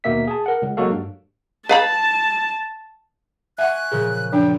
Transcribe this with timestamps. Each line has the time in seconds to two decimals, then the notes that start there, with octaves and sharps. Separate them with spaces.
0.04 D#2 B2 A#3 E5 B6
0.27 G#4 A5
0.46 A#4 F#5
0.62 C#2
0.77 F#3 G#3 A#3 F#4 A4 F5
0.90 G2
1.69 B4 F5 A5 B5
3.58 E5 F#5 G#5 C#6 F#6
3.92 A#2 C#3 F3 G#4
4.32 F#2 F3 D4 G5